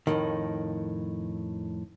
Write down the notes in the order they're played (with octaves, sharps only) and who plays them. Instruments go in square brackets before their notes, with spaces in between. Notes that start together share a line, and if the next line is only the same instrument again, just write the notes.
[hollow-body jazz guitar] F2 A2 D#3